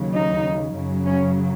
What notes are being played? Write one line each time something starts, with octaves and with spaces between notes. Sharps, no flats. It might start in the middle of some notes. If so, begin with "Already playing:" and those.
Already playing: D#2 C#3 F#3
D#4
F#2 C#3 F#3
C#4